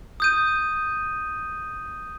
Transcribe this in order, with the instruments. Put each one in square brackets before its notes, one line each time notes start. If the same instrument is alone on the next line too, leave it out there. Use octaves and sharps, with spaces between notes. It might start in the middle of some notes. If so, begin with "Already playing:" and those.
[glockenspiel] D#6 G6 D#7